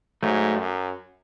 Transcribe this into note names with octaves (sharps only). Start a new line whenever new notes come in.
G#2 F#3 A3
F#2